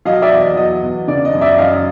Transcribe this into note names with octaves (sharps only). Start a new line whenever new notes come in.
F#3 D#5 F5
D5 E5
E2
D#5
F#3 D#5
E2
C#3 D5
D#5
F#2
D5 E5
F#2 D#5 F5